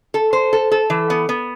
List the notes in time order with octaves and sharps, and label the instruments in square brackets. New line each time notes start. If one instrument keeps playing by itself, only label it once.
[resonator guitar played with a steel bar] A4
C5
A4
A4
E3
B3
B3